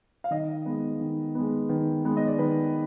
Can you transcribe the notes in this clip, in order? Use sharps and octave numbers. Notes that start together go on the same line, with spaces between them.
F5
D#3 D#5
G#3 B3
D#3
G#3 B3
D#3 B4
G#3 B3
D#5
D5
D#3 B4